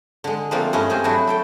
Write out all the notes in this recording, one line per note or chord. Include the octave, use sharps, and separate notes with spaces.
D3 G#3
F3 A3 A#3 C4 D4 F4
G2 G#3 A3 C#4
G2 C4 G#4 C5 G#5
F#3 A3 D4 E4 F#4
A4 E5 G5